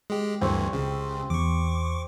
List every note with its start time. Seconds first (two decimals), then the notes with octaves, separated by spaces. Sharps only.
0.10 G#3 G4
0.41 D2 G2 E3 C4 G4 C#5
0.73 C#2 C#3
1.30 E2 C#6 D6